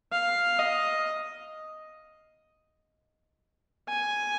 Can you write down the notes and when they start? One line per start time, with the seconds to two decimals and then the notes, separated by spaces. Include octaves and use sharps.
0.12 F5
0.59 D#5
3.88 G#5